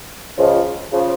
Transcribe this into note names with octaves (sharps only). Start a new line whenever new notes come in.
C#2 C#3 F3
C#3 F3